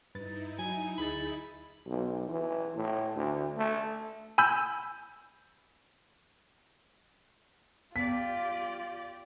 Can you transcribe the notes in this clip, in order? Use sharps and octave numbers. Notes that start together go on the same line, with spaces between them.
G2 D#4 E4 B4 A6
F#3 G#5
D2 G#4 B5 A6
B1
E3
A2
D2
A3
G#5 B5 E6 G6
B3 F4 G4 D5 B6